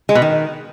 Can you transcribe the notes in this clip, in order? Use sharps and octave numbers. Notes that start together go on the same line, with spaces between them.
G#3
B2
D#3